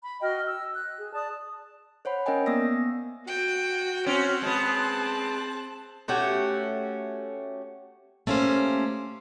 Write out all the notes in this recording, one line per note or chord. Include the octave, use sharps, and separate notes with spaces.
B5
F#4 D#5 G5 F6
E6
F#6
G#4
D5 A5 D#6
C5 C#5 F#5 B5
C#4 A#4 D#5 G5 G#5
A#3 B3 D5 D#6 E6 A#6
F#4 G5
C4 C#4 F#6
G#3 B3 A5
A3 C#4 F#4 G4
A3 A#3 C#4 G4 C5